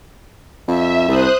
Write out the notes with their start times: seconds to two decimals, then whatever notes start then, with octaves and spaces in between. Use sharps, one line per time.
0.68 F2 E5
1.08 C2 C5 D#6 F#6